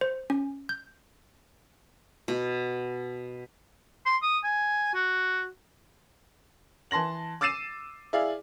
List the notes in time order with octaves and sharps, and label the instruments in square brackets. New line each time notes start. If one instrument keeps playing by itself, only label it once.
[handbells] C5
C#4
G6
[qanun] B2
[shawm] C6
D#6
G#5
F#4
[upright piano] E3 A5 C6 A#6 F#7
D6 E6 A6 C7 D#7 E7
E4 G#4 D5 F5